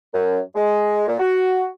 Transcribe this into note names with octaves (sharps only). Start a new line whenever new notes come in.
F#2
G#3
A#2
F#4